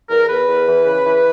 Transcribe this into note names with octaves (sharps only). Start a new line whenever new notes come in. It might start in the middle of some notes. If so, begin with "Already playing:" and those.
E2 A#4
E2 B4
E2
E3
C#3
E3